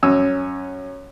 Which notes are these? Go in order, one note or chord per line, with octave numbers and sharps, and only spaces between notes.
F#2 C#4 E6